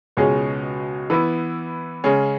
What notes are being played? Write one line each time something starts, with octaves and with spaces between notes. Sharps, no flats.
C#2 B2 G#3 C#4 G#4
E3 B3 E4
C#3 G#3 C#4 G#4